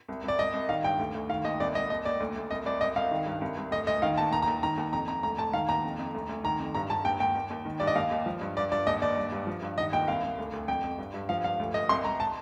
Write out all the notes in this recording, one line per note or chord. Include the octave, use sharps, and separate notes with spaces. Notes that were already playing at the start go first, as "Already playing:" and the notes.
C2
C2 D5
C2 D#5
C2
D#3 F5
G2 G5
D2
D2
D#3 F5
D#2 D#5
C2 D5
C2 D#5
D#2 D#5
D#2 D5
D2
D2
C2 D#5
C2 D5
C2 D#5
C2 F5
D#3
G2
C2
C2
D2 D#5
D2 D#5
D#3 F5
D#2 A5
D#2 A#5
A#5
D#2
D#3 A#5
D#2
F2 A#5
F2 A#5
D2 A#5
D2 A5
D#3 F5
D#2 A#5
F2
F2
D2
D2
D#3 A#5
F2
G2 A#5
G2 A5
D#2 G5
D#2 G5
D#2
D#2
D#3
G2 D5
D#5
D#2 F5
D#2
F3
G2
G2 D5
G2 D5
D#2 D#5
D#2 D5
G2
G2
F3
G2
D#3 D#5
D#2 G5
C2 F5
C2
D2
D2
F2 G5
F2
G2
G2
F3 F5
G2 F5
D2
D2 D#5
C2 C6
C2 A#5
A5